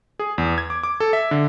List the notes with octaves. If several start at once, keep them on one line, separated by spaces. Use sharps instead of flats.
G#4
E2
G#6
D6
D6
A4
E5
D3